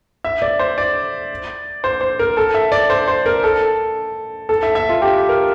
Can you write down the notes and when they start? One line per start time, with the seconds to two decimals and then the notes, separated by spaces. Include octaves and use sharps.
0.24 E5
0.42 D5
0.59 C5
0.78 D5
1.84 C5
2.01 C5
2.19 A#4
2.37 A4
2.54 E5
2.72 D5
2.90 C5
3.08 C5
3.26 A#4
3.44 A4
4.49 A4
4.63 E5
4.75 E5
4.89 F4
5.02 G4
5.29 A#4